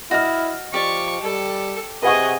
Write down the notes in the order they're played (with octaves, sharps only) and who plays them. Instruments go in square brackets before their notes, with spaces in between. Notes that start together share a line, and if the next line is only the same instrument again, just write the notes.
[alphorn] E4 [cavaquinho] F#4 D#6 [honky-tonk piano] D#5 F6
[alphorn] F3 [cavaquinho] G4 D5 [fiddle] C#6
[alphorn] G3 [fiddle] A4
[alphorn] C3 [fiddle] G#4 D#5 [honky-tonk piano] B4 F#5 C#6